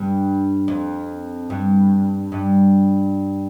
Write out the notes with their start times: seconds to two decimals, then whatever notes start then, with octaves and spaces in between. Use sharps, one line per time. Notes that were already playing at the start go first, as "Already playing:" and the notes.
Already playing: G2
0.68 F2
1.50 G2
2.32 G2